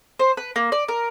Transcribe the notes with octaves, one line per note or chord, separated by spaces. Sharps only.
C5
B4
A#3
D5
A#4